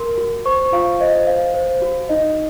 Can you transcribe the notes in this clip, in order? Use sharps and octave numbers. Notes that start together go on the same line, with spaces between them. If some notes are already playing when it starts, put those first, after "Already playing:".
Already playing: A#4 C6
F#4
C5 C#6
F4 F5
C5 D#5
C5 F5
C5
F#4
D#4 D#5